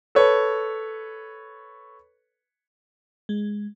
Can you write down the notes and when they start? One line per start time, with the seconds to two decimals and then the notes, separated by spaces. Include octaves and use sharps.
0.15 A4 B4 C#5
3.29 G#3